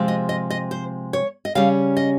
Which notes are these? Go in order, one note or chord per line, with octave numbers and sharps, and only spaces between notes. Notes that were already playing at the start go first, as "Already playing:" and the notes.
Already playing: C3 F3 G#3 C4
D#5
D#5
D#5
C5
C#5
D#5
C#3 G3 C#4 F5
D#5